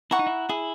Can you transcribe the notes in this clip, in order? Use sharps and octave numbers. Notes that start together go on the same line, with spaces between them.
E4 F#5 A#5 C#6
D#4
E4
E4 G#4